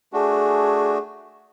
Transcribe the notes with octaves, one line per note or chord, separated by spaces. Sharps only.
A3 D4 F#4 G#4